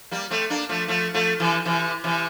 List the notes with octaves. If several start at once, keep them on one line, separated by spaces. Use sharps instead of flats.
G3 A#3
A3 C4
A#3 D4
F3 A3
F3 A3
F3 A3
C3 E3
C3 E3
C3 E3